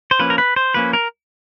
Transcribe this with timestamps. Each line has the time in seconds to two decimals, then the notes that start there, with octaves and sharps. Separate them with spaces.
0.11 C5
0.19 F3 A#3 C#4 B4
0.30 A#4
0.38 B4
0.56 C5
0.74 F3 A#3 C#4 B4
0.93 A#4